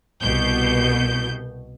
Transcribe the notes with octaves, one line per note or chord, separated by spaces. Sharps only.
C2 B2 G6